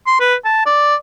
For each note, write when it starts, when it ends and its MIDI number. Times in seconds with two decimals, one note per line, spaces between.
0.07 0.17 84
0.20 0.35 71
0.45 0.65 81
0.66 0.95 74